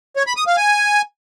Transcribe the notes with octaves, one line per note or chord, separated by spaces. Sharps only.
C#5
B5
D#6
F5
G#5